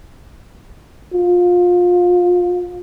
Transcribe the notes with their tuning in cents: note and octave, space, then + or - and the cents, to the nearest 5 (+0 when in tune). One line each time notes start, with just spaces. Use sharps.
F4 +25